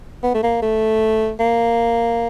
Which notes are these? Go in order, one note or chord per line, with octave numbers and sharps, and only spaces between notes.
B3
A3
A#3
A3
A#3